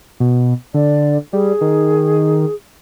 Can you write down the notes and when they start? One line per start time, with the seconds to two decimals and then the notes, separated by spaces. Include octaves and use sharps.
0.20 B2
0.74 D3 D5
1.33 G3 G#4
1.61 D#3